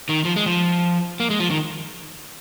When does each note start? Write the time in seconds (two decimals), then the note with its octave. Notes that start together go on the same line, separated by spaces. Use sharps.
0.09 D#3
0.25 F3
0.36 G#3
0.46 F3
1.20 A#3
1.30 G#3
1.40 F3
1.50 D#3